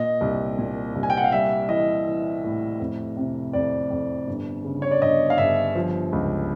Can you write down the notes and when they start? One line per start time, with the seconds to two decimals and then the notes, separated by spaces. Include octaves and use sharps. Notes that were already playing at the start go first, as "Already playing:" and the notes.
Already playing: A#2 D#5
0.21 C2
0.58 A#2
0.95 C2
1.03 G#5
1.10 G5
1.17 F#5
1.24 F5
1.32 G3 E5
1.69 E3 D#5
2.06 E3
2.43 A2
2.80 F2
3.17 C3
3.53 F2 D5
3.90 F2
4.27 G1
4.64 C#3
4.82 C#5
4.91 D5
5.02 G1 D#5
5.30 F5
5.38 G1 E5
5.75 F3
6.13 C#2